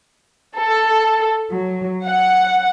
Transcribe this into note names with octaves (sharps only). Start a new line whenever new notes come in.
A4
F#3
F#5